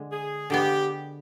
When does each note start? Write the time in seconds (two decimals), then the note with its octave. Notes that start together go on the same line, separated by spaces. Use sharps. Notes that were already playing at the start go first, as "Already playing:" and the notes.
Already playing: D3 G#3
0.12 G#4
0.50 D3 G#3 B3 G4